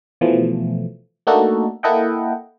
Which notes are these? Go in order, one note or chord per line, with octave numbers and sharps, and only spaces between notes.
B2 E3 F3 A3
A3 A#3 D4 D#4 F#4 A4
A#3 E4 A4 D#5 F#5 G5